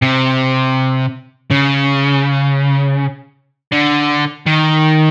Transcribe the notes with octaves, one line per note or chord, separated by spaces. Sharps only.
C3
C#3
D3
D#3